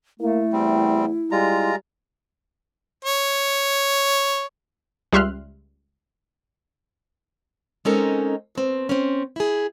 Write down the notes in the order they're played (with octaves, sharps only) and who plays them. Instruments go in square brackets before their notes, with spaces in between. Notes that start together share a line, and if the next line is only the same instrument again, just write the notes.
[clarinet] A3 [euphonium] A#3 [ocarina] E4
[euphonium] E2 [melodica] G3 C4
[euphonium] G3 [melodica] G#3 F4 A#5
[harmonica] C#5
[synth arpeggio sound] C#2 G3 E5 C6 F6 F#6
[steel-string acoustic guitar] G#3 C4 C#4 D#4 A4 A#4
B2 C4
C4 C#4
E4 G#4